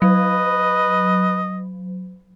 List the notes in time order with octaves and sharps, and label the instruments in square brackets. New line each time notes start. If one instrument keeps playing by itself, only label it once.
[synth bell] F#3 [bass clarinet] B4 [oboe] D#5